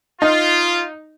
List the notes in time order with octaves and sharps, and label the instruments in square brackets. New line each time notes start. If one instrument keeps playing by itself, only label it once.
[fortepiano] D#4 [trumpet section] F4